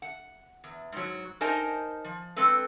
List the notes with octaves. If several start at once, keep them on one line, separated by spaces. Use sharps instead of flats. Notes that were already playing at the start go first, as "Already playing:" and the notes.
F#5
E2
G#2 F#3
D#4 A#4 C5 D#5 G#5 A5
F3
G#3 C4 A4 B4